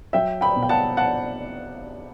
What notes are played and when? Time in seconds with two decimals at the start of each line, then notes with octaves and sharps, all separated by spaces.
0.13 F#3 E5 G5
0.41 G5 B5
0.56 B2
0.63 G5
0.69 F#5 A5
0.97 F#5 A5